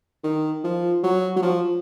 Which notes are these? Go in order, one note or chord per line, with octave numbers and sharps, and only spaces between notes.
D#3
F3
F#3
F#3
F3